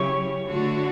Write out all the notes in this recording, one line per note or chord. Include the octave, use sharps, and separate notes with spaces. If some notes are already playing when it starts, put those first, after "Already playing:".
Already playing: C#3 F#3 C#4 E4 G4 C#5
D3 A3 D4 F#4